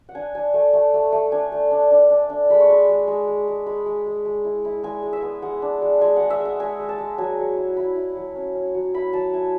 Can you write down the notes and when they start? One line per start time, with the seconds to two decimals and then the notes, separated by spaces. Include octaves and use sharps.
0.09 F#5
0.15 D4 G#5
0.35 D4 G#5
0.54 A3
0.73 A3
0.94 A3
1.12 A3
1.32 D4 G#5
1.52 A3
1.71 D4
1.91 D4
2.10 D4
2.30 D4
2.50 G#3 B5
2.60 C#6
2.69 G#3 B5
2.89 G#3
3.08 G#3
3.27 G#3
3.48 G#3
3.66 G#3 B5
3.86 G#3
4.06 G#3
4.25 G#3
4.45 E4
4.65 E4
4.83 G#3 G#5
5.03 G#3
5.13 E5
5.22 B3
5.42 G#3 F#5
5.62 D4
5.82 G#3
6.01 G#3 G#5
6.16 G#3 F#5
6.30 E5
6.40 G#3
6.45 F#5
6.60 G#3 G#5
6.79 G#3
6.89 A5
6.98 G#3
7.18 F#3 G#5
7.38 F#3
7.57 E4
7.77 E4 B5
7.96 E4
8.16 F#3
8.35 C#4
8.55 C#4
8.74 F#3
8.94 E4 B5
9.13 F#3 A5
9.33 E4 G#5